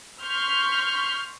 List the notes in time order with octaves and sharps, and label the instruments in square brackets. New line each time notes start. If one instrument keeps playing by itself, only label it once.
[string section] C6 C#6 F6 G6 B6